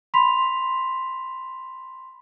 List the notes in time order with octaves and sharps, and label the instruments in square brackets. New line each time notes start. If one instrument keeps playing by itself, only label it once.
[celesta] B5 C6 B6 F7